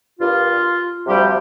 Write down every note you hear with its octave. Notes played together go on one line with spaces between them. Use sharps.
G2 G3 A#3 F4
D2 C3 F3 G3 G4